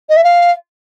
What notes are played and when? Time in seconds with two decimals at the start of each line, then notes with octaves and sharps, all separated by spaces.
0.09 D#5
0.16 E5
0.24 F5